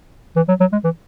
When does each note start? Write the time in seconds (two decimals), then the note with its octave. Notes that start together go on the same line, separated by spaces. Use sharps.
0.36 E3
0.48 F#3
0.60 F#3
0.72 G#3
0.84 E3